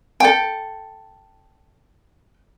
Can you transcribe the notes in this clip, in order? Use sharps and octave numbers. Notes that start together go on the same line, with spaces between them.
A4 G5